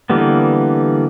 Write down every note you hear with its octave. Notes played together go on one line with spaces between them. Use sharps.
D3 E3 G3 A#3 B3